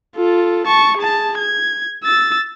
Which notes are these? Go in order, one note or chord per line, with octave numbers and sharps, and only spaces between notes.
F4 A4
A5 C#6
G#4 A5
G#6
E6 A6